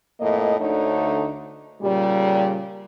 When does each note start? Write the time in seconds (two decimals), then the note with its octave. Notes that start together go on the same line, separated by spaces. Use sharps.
0.21 F2 A2 A#3 D#5
0.59 D2 D3 A3 D#4 C#5
1.82 A#2 C#3 G3